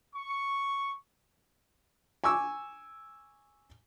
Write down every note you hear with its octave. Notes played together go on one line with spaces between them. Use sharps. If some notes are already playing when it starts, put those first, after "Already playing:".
C#6
G#5 C#6 D6 E6